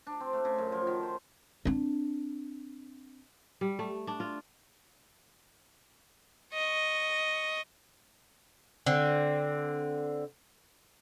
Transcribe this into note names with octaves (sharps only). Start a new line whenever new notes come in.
D4
C4
A3
C#3
F#2
F3
D#3
C5
C4 D4
G3
A3
D4
F4
D#5 C#6
D3 C4